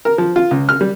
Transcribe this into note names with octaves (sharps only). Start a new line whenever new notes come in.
A#4
F3
F4
C#2
F6
G3